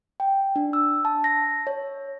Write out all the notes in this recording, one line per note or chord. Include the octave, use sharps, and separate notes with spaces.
G5
D4
E6
A5
A#6
C#5